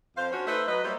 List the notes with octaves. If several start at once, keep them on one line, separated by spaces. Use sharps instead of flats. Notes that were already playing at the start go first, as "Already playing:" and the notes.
F2 C5 F5
C#4 D4 F4 F#4 C5 C#5
A3 D#4 B4 C5 E5
F#3 B4 D#5
G3 A#3 E4 C5 C#5 D#5